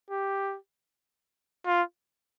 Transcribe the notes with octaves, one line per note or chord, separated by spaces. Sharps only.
G4
F4